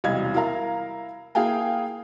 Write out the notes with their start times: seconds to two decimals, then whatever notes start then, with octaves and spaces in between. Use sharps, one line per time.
0.04 E1 C2 D#5 F5 G#6
0.34 E4 A#4 F5 A#5
1.35 A#3 E4 G#4 F5 G5 G#5